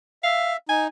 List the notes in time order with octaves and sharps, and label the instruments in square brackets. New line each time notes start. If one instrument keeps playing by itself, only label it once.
[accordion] E5 [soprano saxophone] F5
[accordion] D#4 [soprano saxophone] G#5